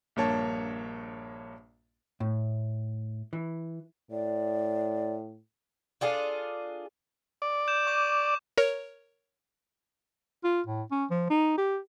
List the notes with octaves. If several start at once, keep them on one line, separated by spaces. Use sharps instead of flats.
A#1 G2 A#3 C#5 A5
A2
E3
A2 D5
D4 F4 G#4 A4
D5
G6 E7
C#6 D6 G6
A#4 C#5
F4
A2
C#4
F3
D#4
G4